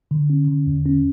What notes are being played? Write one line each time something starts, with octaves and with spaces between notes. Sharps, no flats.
D3
C#4
D3
E2
C#4